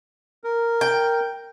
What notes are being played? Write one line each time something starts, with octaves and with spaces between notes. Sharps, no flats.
A#4
G5